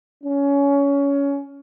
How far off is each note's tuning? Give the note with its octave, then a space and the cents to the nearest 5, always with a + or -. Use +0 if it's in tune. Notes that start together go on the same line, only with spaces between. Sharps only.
C#4 +20